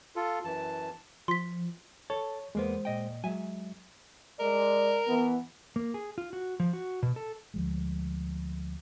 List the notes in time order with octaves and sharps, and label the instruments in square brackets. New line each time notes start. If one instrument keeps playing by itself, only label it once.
[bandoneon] F4 A4
F#2 E3 A5
[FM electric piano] F3 [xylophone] C6 B6
[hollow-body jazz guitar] A4 [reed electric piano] C#5
[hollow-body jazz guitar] E2 A#3 B3 [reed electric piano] G#3 C5
[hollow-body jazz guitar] A#2 D#5 G5
[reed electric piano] F#3 [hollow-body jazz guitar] G#3 E5 G#5
[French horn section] G#3 D5 [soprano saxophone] A#4
[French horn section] E3 B3
[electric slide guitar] A#3
G#4
F4
F#4
F3
F#4
B2
A4
[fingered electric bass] D2 F3 G#3